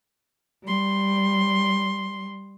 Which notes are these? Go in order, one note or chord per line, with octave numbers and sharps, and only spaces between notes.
G3 C6